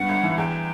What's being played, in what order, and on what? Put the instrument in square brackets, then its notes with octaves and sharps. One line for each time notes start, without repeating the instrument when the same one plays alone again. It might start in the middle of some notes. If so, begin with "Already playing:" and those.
Already playing: [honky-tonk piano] G2 B3 [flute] F#5
[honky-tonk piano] G1
E3
[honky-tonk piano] E2 [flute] G5